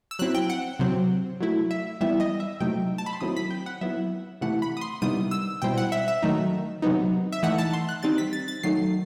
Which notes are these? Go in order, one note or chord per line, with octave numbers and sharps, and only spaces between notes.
E6
F#3 C4 E4 F#6
G5
F#5
C3 F#3 C4
F#3 A3 E4
E5
E3 G3 B3 E4 E5
D#5
E5
C3 F#3 A3 D#4 G5
A5
B5
C6
D#3 F#3 A3 C4 E4 D#6
B5
G5
F#5
F#3 B3 E4 E5
C3 E3 A3 E4 F#5
B5
D#6
C6
C3 D#3 G3 B3 E4 D#6
E6
B2 G3 C4 E4 G5
F#5
E5
E5
D#3 F#3 A3 D#4
C3 F#3 B3 D#4
E5
E3 A3 D#4 F#5
A5
C6
F#6
D#3 G3 C4 D#4 A6
B6
A6
A6
D#3 F#3 A3 D#4 C7